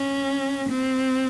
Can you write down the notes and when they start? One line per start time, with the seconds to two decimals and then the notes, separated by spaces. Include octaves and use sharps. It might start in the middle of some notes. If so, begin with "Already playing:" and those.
Already playing: C#4
0.69 C4